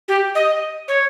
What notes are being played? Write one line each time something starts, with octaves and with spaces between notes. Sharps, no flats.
G4
D#5
C#5